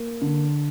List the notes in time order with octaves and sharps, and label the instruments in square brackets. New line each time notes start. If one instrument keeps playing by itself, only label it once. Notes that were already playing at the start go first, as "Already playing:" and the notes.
Already playing: [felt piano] A#3
D3